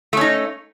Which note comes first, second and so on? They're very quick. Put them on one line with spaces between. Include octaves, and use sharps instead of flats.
A3 C#4 D#4